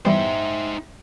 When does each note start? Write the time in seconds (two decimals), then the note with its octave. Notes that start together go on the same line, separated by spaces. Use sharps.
0.05 E3 G3 B3 D#4 C5 E5 G5